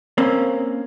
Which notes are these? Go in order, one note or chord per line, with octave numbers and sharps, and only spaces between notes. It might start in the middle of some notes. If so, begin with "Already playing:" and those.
A#3 C4 C#4